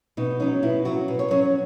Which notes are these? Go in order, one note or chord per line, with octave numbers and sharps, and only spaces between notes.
B2 D#4
F#3 C#4 D#4
B2 E4
F#3 C#4 F#4
B2
C#5
F#3 C#4 C#5